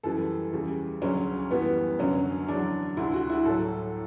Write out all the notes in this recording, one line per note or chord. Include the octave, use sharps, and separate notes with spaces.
F#2 E3 G3 A4
E2 C#3 G3
D2 C#3 F#3 C#4
F#2 E3 G3 B3
F#2 D3 F#3 C#4
E2 D3 F#3 D4
D2 D3 G3 E4
F#4
E4
A2 F#3 A4